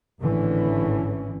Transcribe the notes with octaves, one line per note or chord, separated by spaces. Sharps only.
G#1 A2 D3 E3 C#4